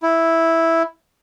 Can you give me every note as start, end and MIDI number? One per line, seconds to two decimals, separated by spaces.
0.03 0.83 64